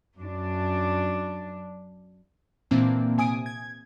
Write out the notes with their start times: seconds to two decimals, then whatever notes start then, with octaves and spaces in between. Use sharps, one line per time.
0.17 F#2 D4
2.71 A#2 E3 A#3 C4 D4
3.18 C3 G#5 D#6 D7
3.46 G#6